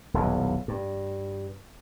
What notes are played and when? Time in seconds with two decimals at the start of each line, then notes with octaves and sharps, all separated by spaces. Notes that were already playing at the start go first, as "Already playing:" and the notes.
0.14 D#1 B1 E2
0.68 G2